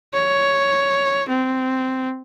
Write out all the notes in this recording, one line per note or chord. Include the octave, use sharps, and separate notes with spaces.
C#5
C4